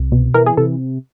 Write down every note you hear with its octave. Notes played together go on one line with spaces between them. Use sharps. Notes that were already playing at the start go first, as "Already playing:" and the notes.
Already playing: C2
B2
E3 A#4
G#4
C3 A4